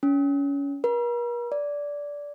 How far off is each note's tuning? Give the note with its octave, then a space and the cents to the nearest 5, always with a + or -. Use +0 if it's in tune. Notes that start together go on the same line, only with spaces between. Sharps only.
C#4 +25
A#4 +45
D5 -15